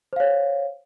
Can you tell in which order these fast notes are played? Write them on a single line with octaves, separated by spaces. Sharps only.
C5 F5 C#5